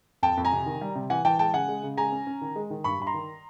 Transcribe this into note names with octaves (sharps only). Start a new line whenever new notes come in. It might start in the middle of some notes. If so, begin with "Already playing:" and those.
F2 G5 A5
F2
G#5 A#5
C3
D#3
G3
C3
E3 F#5 G#5
E3 G5 A5
G#3 G5 A5
C#3 F#5 G#5
G#3
C#3
G#3 G#5 A#5
C#4
C#4
D#3
G#3
D#3
G2 B5 C#6
G2 B5
A#5 C6
D#3